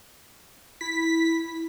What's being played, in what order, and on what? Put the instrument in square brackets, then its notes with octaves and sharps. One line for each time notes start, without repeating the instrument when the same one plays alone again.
[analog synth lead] E4 [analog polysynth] B6